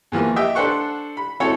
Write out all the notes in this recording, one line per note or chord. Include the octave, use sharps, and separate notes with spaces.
E2 E3 F3 A#3
G4 D#5 E5 G5
D4 A4 C5 F#5 C#6
B5
C4 E4 F#4 A4 C#5